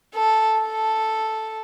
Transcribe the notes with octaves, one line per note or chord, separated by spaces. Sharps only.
A4
A4